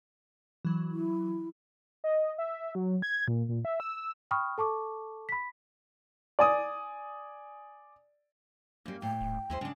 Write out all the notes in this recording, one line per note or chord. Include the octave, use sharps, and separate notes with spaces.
E3 F#3
E4
D#5
E5
F#3
G#6
A#2
A#2
E5
E6
G5 B5 C#6 D#6 F6
A4 A5 C#6 D6
B5 B6
D5 G#5 D#6
F#2 G3 A#3
A2 G5
D#1
D#2 G#3 E4 C5
C#3 G#3 D4